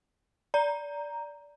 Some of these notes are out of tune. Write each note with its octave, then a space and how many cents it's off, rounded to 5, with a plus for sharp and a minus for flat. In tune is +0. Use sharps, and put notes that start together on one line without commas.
D5 -15 A#5 +0